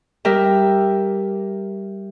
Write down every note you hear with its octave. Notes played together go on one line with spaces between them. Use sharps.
G3 G4 A#4 E5